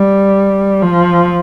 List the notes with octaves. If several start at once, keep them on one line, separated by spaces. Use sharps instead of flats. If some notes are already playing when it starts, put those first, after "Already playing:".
Already playing: G3
F3